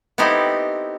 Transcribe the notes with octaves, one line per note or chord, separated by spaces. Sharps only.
B3 C4 D#4 E4 G4 A4